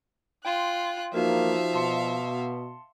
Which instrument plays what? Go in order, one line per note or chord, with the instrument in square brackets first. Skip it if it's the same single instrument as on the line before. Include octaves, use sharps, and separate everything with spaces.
[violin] F4 F#6 [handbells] G5 C6
[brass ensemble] E2 A#3 [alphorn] F3 [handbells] D#4 F#4 A#4 [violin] E5 F5
[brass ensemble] B2 [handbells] A5 C6 C#7